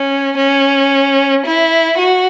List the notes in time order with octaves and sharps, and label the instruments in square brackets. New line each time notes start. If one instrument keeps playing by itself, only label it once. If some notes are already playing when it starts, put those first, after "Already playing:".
Already playing: [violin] C#4
C#4
E4
F#4